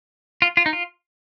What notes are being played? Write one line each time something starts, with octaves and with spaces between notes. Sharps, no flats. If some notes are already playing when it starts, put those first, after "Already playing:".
F4
F4
D#4
F4